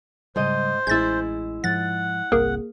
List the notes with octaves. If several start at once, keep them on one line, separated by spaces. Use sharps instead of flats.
G#2 C#3 G3 C5 D#5
A1 G#3 E4 G6 A6
G#2 F3 F#5 A6
G1 C2 A#3 G#4 A#4